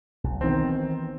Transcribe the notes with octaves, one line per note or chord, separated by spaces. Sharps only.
B1
D#3 E3 B3 C4